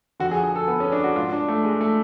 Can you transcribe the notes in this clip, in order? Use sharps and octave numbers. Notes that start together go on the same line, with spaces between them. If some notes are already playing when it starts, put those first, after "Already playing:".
F2 D3 F#4
G#4
G#4
A4
B3
C#4
D4
F#4
G#2 F4
D4
A3
G#3
A3